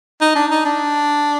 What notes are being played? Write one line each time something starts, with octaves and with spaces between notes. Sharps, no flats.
D#4
D4
D#4
D4